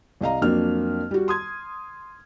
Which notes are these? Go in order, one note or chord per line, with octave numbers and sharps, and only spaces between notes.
C2 D#5 F5 A#5
F2 F#3 A#3 D4 F6
G3 F#4
C6 D#6 G#6